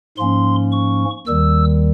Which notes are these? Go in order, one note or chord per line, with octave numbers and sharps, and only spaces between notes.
G#2 F3 A#3 C#4 C6
C#6
D#2 D#3 G3 E6